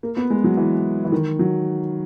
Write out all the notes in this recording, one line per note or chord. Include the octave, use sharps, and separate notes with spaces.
A#3
B3
G#3
F#3
E3
E3
D#3
F#3